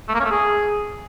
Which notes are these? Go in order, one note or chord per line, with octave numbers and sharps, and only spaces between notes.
A3
A#3
C#4
A3
G#4